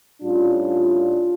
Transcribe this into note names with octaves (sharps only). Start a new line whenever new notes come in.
A2 G3 C#4 D4 F4